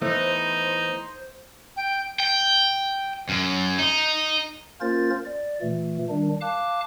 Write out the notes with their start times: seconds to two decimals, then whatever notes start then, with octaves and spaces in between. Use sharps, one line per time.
0.02 E3 A3 B3 D#4 C5
1.76 G5
2.20 G5
3.29 F#2
3.79 D#4
4.81 A#3 C#4 F4 A#4 C5 A6
5.26 D5
5.62 A#2 E3 A3
6.09 D#3 G3 D4
6.41 F5 A5 D6 F#6